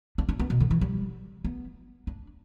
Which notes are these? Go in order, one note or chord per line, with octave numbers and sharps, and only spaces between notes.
D4
D4
B3
B2
D3
E3
G3
B3
D4